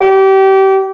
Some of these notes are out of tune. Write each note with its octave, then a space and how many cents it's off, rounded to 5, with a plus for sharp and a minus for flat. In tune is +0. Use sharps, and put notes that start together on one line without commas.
G4 -30